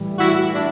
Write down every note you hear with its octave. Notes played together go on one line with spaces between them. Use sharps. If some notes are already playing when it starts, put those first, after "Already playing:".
Already playing: A2 E3 G3
E4 F#4
D4 E4